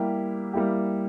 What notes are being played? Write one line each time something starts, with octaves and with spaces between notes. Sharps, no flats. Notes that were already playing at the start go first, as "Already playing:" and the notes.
Already playing: G3 A#3 E4 G4
G3 A#3 E4 G4